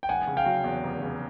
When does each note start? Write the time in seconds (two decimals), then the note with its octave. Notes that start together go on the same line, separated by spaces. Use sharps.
0.03 G5
0.09 F1 F#5 G#5
0.27 C#3
0.37 F5 G5
0.46 F#3
0.64 E2
0.83 F1
1.02 C#3